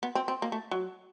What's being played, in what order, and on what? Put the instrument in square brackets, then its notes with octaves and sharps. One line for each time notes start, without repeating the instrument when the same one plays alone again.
[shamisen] B3
C4
C4
A#3
A3
F#3